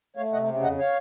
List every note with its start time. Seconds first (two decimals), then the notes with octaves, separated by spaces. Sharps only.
0.17 A3 C#5 F5
0.33 C3 D#5 F#5
0.48 C#3
0.63 F2 D#5 F#5
0.79 C#5 F5